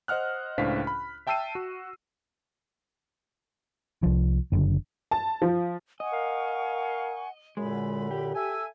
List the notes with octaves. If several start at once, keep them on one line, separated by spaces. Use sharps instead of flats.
C5 D#5 F#5 F6 F#6
C#2 A2 D4 C5 F5 B6
B5
E5 G5 A5 E6 C7 D#7
F#4
C2 F3
F#1 D3
A5
F3
D#5 F#5 G#5 C#6
A#4 F5
F#2 A#2 D3 G#3 B5
G4
A4 E5 G#5 E6